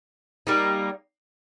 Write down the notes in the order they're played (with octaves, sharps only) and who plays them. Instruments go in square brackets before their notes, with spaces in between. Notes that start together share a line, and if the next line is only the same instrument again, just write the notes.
[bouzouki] G3 A#3 D#4